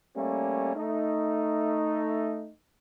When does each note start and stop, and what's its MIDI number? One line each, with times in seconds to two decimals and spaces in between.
0.17 0.75 55
0.17 0.75 57
0.17 0.75 58
0.17 0.75 61
0.76 2.50 57
0.76 2.50 63